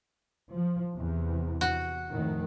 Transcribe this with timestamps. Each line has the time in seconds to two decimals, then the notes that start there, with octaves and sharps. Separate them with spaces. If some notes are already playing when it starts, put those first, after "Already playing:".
0.52 F3
0.92 E2 C3
1.61 F#4
2.10 F2 A2 D#3